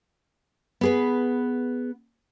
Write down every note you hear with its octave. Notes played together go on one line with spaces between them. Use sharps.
B3 G#4 B4